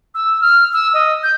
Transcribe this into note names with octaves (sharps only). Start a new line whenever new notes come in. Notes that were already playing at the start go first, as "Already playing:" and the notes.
E6
F6
E6
D#5
G6